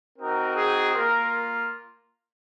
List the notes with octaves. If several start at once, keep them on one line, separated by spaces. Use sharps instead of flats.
C4 D#4 F#4 A#4
G#4
A#3 F4 A#4